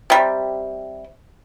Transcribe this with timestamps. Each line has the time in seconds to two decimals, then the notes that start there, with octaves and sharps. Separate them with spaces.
0.10 C3 G3